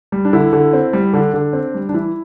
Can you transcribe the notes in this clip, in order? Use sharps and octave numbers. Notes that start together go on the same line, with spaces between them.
G3
D4
D3 E4
D3
C4
G3
D3 D4
D3
C4
G3
D4
E3 E4